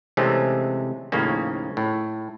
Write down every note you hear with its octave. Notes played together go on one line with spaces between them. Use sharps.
C3 E3 G#3 A3 C4 C#4
D#2 A2 C#3 F3 A#3 C#4
A2